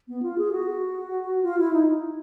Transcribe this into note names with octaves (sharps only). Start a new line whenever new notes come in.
B3
F4
G#4
F#4
F4
E4
D#4